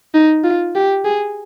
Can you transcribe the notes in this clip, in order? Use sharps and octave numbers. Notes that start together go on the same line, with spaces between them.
D#4
F4
G4
G#4